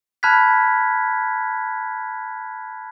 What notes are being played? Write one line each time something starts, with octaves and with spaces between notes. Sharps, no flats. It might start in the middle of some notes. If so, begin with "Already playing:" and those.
A5 B5 F6 F#6 G#6 B6